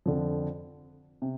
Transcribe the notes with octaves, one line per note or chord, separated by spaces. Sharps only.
F2 D3 F3
C3